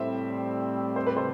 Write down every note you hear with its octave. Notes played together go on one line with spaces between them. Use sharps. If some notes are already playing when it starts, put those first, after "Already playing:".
Already playing: A2 G3 C4 C5 E5
C5
B4
A4 C5